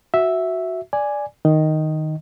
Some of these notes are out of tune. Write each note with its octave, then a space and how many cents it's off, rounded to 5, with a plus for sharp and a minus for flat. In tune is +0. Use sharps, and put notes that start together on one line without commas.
F#4 +0 E5 -5
D5 +0 G#5 +0
D#3 +0 D#5 +0